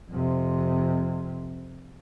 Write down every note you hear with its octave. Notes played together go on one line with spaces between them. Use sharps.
F2 C3